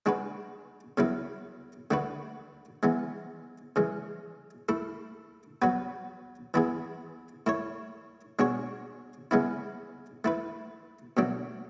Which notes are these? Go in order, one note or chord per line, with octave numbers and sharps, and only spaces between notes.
G#3 D4 F#4 B4
C#3 F#3 B3 E4 B4
D3 A3 D4 F#4 B4
E3 G#3 B3
C#3 E3 G#3
A3 E4 A4
F#3 B3 F#4 B4
E3 B3 E4 G#4
A3 E4 A4 C#5
B2 G#3 D4 F#4 C#5
C#3 G#3 B3 E4
A3 E4 B4
B2 F#3 A3 D4